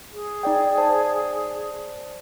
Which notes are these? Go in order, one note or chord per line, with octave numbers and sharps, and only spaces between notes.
G#4
D#4 D5 G5
C5 D5 A5